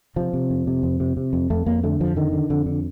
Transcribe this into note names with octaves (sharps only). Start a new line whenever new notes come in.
C3 F3
C3
F2
C3
F2
C3
C3
F2
F2 A3
F2 A#3
D3 A3
F2 F3
D3 D#3
D3
F2 D3
D3